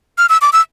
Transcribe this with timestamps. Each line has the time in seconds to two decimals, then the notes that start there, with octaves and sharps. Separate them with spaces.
0.18 F6
0.29 E6
0.42 D6
0.53 E6